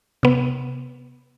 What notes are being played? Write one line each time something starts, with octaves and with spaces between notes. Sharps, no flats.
C3 B3